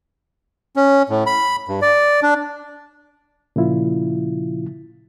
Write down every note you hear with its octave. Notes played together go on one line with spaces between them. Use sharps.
C#4
A2
B5
G2
D5
D4
A#2 C#3 F3 E4 F4